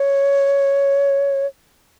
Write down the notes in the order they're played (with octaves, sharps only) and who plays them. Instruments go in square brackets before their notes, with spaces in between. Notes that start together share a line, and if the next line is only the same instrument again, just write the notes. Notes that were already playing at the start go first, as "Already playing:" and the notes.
Already playing: [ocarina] C#5